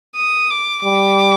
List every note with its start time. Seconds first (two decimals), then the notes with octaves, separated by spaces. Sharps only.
0.16 D#6
0.51 D6
0.84 G3 D6